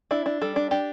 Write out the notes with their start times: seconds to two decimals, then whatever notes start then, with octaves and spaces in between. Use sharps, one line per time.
0.11 D4 E4
0.26 D4
0.42 G3 A4
0.56 D4
0.71 D4 G4